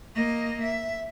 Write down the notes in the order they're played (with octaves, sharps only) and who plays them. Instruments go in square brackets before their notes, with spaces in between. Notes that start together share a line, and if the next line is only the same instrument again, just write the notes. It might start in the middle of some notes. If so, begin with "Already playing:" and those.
[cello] A#3 D#5
E5